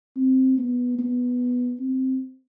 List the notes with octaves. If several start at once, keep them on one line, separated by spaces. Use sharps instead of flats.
C4
B3
B3
C4